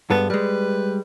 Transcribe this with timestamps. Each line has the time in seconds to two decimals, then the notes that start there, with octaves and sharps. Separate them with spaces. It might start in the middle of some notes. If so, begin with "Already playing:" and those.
0.10 G2 G#3 B3 A4
0.30 G3 G#3 B4